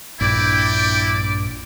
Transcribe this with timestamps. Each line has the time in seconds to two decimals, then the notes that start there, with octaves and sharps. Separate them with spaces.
0.20 A#1 G2 E4 D5 G5 D6